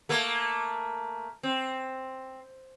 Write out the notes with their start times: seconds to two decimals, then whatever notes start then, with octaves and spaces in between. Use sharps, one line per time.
0.09 A3 A#3
1.43 C4